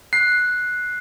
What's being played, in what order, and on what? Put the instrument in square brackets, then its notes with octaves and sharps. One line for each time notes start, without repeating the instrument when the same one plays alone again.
[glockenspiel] F#6 [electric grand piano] C7